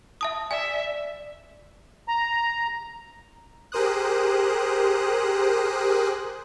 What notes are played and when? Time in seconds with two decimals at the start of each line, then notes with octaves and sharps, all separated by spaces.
0.21 E5 A5 D#6
0.51 D5 E5 G#5
2.08 A#5
3.72 G4 G#4 A#4 C5 D#6 F#6